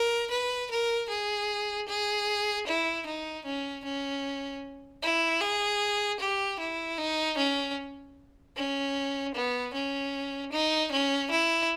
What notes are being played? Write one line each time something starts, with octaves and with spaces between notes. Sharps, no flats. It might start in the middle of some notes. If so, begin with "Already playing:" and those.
Already playing: A#4
B4
A#4
G#4
G#4
E4
D#4
C#4
C#4
E4
G#4
G4
E4
D#4
C#4
C#4
B3
C#4
D#4
C#4
E4